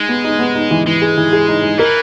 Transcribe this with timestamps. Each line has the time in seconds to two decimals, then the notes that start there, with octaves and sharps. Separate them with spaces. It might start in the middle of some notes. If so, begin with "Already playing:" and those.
Already playing: G#3 D#4
0.09 B3
0.24 D#4
0.39 B3
0.55 D#4
0.71 E3
0.85 E3 G#3
1.02 G#4
1.17 E3
1.33 G#4
1.48 D#4
1.63 D#4
1.78 E3 A#4